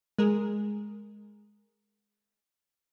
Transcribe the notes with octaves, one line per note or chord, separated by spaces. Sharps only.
G#3 G#4 A#4